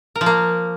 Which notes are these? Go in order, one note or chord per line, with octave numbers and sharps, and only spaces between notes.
A#4
F3
A#3